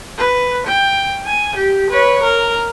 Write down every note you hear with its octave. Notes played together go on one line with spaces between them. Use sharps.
B4
G5
G#5
G4
B4 C#5
A#4